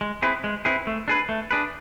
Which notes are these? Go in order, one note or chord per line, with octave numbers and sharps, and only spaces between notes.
G#3
C4 E4 G#4 B4
G#3
C4 E4 G#4 B4
A3
D4 G#4 B4
A3
D4 G#4 B4